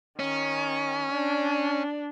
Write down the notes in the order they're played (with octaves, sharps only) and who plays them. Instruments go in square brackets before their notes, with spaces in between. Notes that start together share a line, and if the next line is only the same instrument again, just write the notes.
[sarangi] D#3 [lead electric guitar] C#4
[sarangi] D4